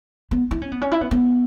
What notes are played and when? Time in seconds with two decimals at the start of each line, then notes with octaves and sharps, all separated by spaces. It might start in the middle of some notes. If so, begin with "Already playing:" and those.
0.31 B3
0.51 E4
0.62 C#4
0.72 B3
0.81 C#4
0.92 E4
1.01 B3
1.11 B3